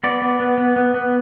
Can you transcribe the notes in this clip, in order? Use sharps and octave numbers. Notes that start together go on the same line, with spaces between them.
B3 D5
B3
B3
B3
B3
B3